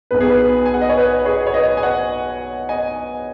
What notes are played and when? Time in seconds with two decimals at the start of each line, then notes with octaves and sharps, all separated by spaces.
0.11 B1 B2 B4
0.20 G#4
0.29 B4
0.66 G#5
0.74 F#5
0.82 D#5
0.89 C#5
0.98 B4
1.25 G#4 C#5
1.47 C#5
1.54 B4 D#5
1.77 G#5
1.83 C#5 F#5
2.69 D#5 G#5